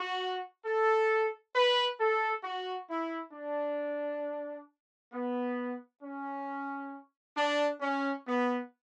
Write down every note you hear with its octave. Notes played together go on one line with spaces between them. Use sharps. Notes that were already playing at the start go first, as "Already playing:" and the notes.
Already playing: F#4
A4
B4
A4
F#4
E4
D4
B3
C#4
D4
C#4
B3